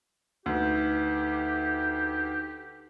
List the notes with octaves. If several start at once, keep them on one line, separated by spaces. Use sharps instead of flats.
D2 D#4 G4 B4